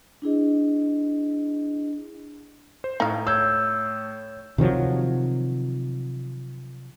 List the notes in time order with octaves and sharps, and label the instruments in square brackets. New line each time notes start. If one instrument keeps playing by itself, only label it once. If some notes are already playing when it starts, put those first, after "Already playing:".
[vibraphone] D4 E4 G#4 D#5
[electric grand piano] C5
[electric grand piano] A2 A3 [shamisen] D#4 F5
[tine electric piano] C#5 G6 G#6 [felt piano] E6
[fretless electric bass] C3 D#3 F3 F#3